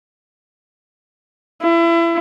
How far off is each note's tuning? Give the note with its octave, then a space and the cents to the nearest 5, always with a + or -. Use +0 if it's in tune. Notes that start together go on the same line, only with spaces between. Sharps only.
E4 +30